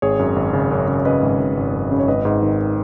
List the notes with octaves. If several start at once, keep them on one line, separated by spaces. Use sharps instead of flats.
G#1 G#4 C#5
F#2
G#1
C#3
F#2
C#3
C#3 B4 D#5
G#1
G#1
G#1
F#2
C#3
C#5
G#1 B4 D#5
G#2
D#3